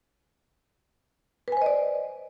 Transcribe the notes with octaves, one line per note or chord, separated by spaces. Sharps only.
B4 C5 D5 D#5 G#5